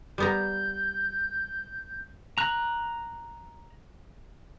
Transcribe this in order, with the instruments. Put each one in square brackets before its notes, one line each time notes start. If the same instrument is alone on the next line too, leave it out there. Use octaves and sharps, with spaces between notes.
[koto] G3 B3 A#5 [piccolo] G6
[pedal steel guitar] A#5 F#6